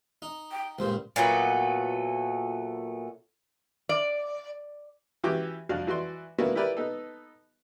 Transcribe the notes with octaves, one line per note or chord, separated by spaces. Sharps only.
D#4
G5
C#2 G2 A#2 C5
A#2 F#3 A3 B3
D5
E3 C#4 F#4 G4 D6
F2 D4 F#4 F5
E3 F#4 D5 C6
A#3 B3 C#4 D4 E4 F#4
E4 G4 A#4 B4 D5
B3 D#4 A4